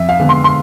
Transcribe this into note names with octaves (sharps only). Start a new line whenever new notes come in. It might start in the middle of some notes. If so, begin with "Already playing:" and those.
Already playing: F2 E5
F5
D3 G#3 B3
C6
C6